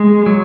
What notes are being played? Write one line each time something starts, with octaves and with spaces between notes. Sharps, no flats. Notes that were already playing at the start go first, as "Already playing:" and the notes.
Already playing: G#3
F#3